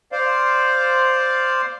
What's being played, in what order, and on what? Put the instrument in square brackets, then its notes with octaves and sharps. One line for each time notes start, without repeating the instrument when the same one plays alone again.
[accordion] C5 D5 F5